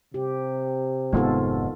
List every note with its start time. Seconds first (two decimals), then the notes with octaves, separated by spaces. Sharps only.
0.14 C3 G4
1.13 F1 G#2 D#3 G#3 B3 F4 A4